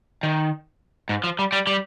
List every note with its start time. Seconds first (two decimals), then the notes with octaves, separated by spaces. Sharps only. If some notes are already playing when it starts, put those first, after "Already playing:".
0.23 D#3
1.09 G#2
1.24 F3
1.39 G3
1.52 G3
1.67 G3